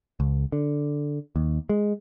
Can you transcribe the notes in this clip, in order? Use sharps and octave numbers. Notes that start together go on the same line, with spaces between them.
C#2
D3
D#2
G#3